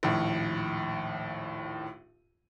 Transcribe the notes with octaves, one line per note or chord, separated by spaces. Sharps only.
A#1 D#2 A2